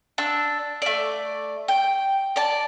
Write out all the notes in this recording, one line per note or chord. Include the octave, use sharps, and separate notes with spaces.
D4 E6
A3 D5
G5
D5 A5